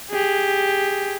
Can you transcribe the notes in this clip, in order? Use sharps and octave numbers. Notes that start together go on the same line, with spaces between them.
G4 G#4